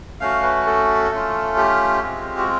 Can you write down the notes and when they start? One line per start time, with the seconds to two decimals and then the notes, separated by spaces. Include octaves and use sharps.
0.20 A3 C#4 F#4 F5
0.43 B4
0.66 A4
1.11 A3 C#4 F4
1.57 G4
2.03 G#3 C4 F4
2.38 F#4